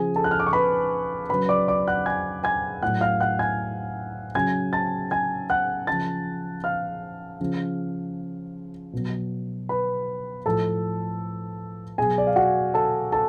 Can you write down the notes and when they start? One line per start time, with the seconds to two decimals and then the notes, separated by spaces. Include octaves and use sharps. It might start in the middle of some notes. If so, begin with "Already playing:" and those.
Already playing: C#3 F3 G#4 G#5
0.16 A4 A5
0.24 F#6
0.31 F6
0.40 D6
0.47 C#6
0.53 B4 B5
1.29 C#3 F#3 B4 B5
1.49 D5 D6
1.68 D5 D6
1.88 F#5 F#6
2.06 G#5 G#6
2.44 G#5 G#6
2.83 A2 F#3 F#5 F#6
3.01 F5 F6
3.21 F#5 F#6
3.39 G#5 G#6
4.35 C#3 F#3 G#5 G#6
4.73 A5 A6
5.11 G#5 G#6
5.50 F#5 F#6
5.87 C#3 F3 A5 A6
6.64 F5 F6
7.41 C#3 F3
8.93 B2 F#3
9.69 B4 B5
10.46 A2 F3 A4 A5
11.98 B2 F#3 G#4 G#5
12.18 D5
12.27 F5
12.36 F#4 F#5
12.74 A4 A5
13.12 A4 A5